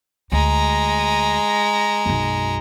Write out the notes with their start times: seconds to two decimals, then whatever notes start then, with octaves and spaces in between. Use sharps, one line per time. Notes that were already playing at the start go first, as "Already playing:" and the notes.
0.32 D2 G#3 A#5
2.06 B1 F#2